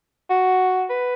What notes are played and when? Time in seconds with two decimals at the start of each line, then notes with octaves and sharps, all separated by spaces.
0.30 F#4
0.90 B4